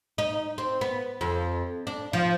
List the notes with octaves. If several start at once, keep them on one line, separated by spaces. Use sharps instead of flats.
D#4
C4
B3
F2
D4
F3